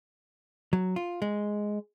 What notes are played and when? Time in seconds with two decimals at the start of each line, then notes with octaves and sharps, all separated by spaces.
0.73 F#3
0.96 F4
1.22 G#3